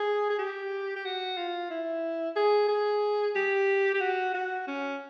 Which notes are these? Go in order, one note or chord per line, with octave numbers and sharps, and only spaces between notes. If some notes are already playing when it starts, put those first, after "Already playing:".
Already playing: G#4
G#4
G4
G4
F#4
F4
E4
G#4
G#4
G4
G4
F#4
F#4
C#4